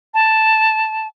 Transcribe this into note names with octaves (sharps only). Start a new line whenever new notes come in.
A5